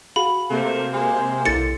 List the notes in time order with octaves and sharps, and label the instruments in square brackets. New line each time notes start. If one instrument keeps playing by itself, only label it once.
[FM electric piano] F#4 G#4 F5 [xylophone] B5
[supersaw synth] C3 A#3 C5 [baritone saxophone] A3
[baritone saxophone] G#3
[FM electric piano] B1 E4 [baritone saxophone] D3 [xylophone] A6 C#7